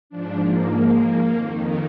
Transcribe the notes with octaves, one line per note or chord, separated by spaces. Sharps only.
G#2 F3 D4
A#3
F2 D#3